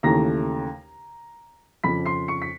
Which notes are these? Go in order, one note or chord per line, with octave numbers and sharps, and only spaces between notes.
D#2 C#3 E3 A3 A#5 A#6
F2 C#3 F3 B5 B6
C6 C7
C#6 C#7
B6